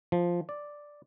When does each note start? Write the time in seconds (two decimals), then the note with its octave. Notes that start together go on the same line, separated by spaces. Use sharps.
0.12 F3
0.49 D5